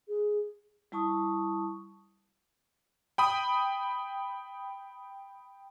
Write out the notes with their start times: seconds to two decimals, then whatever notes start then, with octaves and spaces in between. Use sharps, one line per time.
0.08 G#4
0.92 G3 E4 A5 C#6 D#6
3.18 G5 B5 D#6